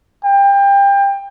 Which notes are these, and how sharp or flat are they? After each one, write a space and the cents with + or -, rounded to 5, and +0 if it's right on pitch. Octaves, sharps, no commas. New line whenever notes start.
G5 +25